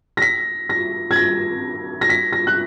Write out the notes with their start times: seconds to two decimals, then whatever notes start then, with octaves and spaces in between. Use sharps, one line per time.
0.17 A#6
0.22 B6
0.70 A#6
1.11 G#6
1.16 A#6
2.01 A#6
2.10 B6
2.33 A#6
2.47 F#6